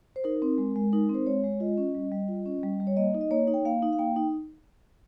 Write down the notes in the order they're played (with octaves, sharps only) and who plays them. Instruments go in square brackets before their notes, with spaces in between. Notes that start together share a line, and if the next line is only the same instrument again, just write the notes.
[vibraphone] C5
D#4 A#4
C4
G#3
G#3
D#4 A#4
C4
C5
G#3 C#5
G#3
F4 D#5
C#4
G3
G3
F4
C#4
G3
G3
C#5
A#3 D#5
D#4
D#5
A#3 C#5
D#4
G5
A#3 F5
D#4
F5
A#3 G5
D#4